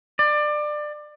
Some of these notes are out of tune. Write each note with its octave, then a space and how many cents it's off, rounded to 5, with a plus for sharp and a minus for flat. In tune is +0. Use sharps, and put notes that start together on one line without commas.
D5 +25